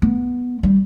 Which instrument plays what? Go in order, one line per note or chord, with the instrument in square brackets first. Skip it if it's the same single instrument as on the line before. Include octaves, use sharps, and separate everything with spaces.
[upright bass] B3
G3